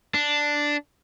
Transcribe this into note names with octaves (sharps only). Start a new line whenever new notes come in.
D4